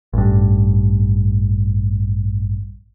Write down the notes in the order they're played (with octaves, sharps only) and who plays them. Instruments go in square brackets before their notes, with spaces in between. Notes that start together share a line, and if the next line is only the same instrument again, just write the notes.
[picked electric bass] A1 G2